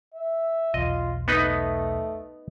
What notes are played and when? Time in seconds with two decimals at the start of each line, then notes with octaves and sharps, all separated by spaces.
0.14 E5
0.74 B1 E2 F4 D#5
1.28 A3 B3 D#4 B4